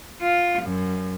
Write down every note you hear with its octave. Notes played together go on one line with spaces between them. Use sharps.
F4
F#2